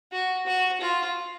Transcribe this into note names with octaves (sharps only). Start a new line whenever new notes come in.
F#4
F#4
F4